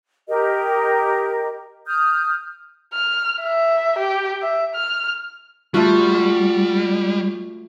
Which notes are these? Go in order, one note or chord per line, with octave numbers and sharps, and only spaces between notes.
G4 A#4 D#5
D#6 F6 G6
F6
E5
G4
E5
F6
G3 A3 F4 F#4